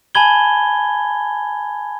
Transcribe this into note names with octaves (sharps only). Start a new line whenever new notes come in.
G#5 A5 B5 G#6 G7